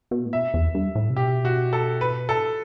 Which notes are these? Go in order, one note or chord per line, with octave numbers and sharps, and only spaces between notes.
B2
A2
B2 E5
E2
G2
A2
C3
B2 G4
F#4
A4
B4
A4